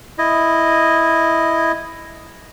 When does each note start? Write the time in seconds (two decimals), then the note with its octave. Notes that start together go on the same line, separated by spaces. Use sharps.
0.18 E4 D#5